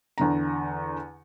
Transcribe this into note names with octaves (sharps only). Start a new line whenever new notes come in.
E2 D3 A#5